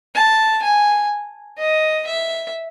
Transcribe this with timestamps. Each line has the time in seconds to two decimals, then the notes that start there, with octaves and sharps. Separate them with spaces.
0.15 A5
0.63 G#5
1.58 D#5
2.07 E5